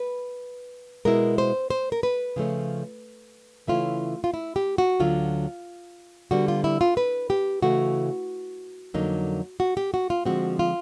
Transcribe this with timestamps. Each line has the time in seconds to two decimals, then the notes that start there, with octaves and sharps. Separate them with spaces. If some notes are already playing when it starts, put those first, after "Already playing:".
Already playing: B4
1.05 B2 G#3 B3 E4 A#4
1.38 C5
1.70 C5
1.92 A#4
2.03 B4
2.36 C#3 F3 A3 C#4
3.67 C#3 E3 A3 C#4 E4 F4
4.24 F4
4.34 E4
4.56 G4
4.78 F#4
5.00 D2 D3 F#3 F4
6.31 D3 G3 B3 F#4
6.48 F4
6.64 E4
6.81 F4
6.97 B4
7.30 G4
7.62 C#3 E3 A3 F#4
8.94 F2 D3 F#3 A#3 D#4
9.60 F#4
9.77 G4
9.94 F#4
10.10 F4
10.25 D3 F3 G#3 C4 F#4
10.59 F4